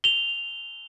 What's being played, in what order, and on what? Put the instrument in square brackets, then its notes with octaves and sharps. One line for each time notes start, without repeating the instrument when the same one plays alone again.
[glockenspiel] F7 G7